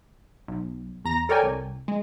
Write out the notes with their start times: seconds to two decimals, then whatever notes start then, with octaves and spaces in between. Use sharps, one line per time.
0.48 B1
1.04 E2 A#5 A#6
1.29 A4 A#4 C#5 D5 G5 G#5
1.43 C2
1.88 G#3